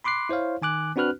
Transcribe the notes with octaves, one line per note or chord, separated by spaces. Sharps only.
B5 C6 D6 F#6 C7
E4 C5 C#5 F5
D#3 G#5 D6 F#6
C4 D4 F#4 B4 F6 F#6